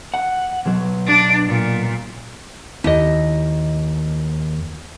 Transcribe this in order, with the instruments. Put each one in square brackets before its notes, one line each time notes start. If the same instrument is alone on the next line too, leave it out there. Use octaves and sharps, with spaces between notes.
[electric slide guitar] F#5
B2 F#3
[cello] D4 D5
A#2
[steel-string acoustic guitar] D#2 [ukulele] E4 D#5